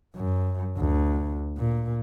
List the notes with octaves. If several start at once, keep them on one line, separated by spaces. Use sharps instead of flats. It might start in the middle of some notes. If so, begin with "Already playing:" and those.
F#2
D2
A#2